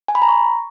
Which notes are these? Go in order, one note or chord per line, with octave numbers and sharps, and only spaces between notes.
G#5
B5
A#5
C#6